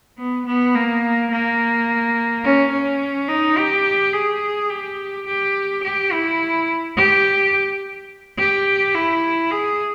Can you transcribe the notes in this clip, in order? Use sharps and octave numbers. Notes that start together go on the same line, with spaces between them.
B3
B3
A#3
A#3
C#4
C#4
D#4
G4
G#4
G4
G4
G4
E4
G4
G4
E4
G#4